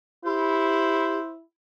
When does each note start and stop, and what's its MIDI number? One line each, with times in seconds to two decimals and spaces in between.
0.25 1.44 64
0.25 1.19 67
0.25 1.32 72